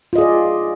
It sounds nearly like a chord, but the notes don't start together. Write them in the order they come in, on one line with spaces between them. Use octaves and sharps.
F4 D#5 G#4 D5